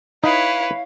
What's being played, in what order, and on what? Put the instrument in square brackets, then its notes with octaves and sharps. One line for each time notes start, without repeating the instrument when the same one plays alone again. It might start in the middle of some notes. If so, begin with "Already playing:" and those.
[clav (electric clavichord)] D#4 [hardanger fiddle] E4 C#5 [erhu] B4 [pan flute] F5